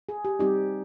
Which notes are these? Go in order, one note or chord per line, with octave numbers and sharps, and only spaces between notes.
G#4
G4
G3 C4 D#4 G4